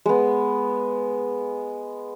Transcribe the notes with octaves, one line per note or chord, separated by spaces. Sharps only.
G#3 B3